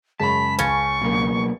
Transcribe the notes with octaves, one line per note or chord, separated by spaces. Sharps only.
F#2 C#3 G#3 A5 B5 B6
C#2 C#4 F5 C#6 A6
B2 F#3 A#3